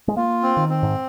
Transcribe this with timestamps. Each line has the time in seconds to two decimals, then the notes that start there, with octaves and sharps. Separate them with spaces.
0.08 G#3
0.17 A#3 F4
0.43 C4
0.57 D#3
0.69 C4
0.83 G#2